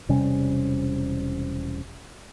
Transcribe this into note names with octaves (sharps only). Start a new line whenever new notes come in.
E1 C3 G3 C#4